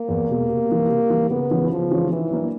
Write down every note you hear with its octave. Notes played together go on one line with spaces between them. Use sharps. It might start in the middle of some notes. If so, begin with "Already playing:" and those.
Already playing: A#3
E2
B2 G#3
C3
E3 G3
C3
E3 G3
C#3 B3
E3 G#3 C#4 F4
C#3 F3
E3 G#3 C#4 F4
D#3 E3
F#3 A#3 D4